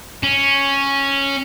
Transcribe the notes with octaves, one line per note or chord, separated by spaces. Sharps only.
C#4